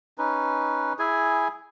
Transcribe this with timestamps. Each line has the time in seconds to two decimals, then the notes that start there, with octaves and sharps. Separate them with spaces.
0.18 C#4 D#4 B4
0.99 E4 G#4 G#5